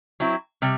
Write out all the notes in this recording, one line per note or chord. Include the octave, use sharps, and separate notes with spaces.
F#3 C4 E4
C3 G3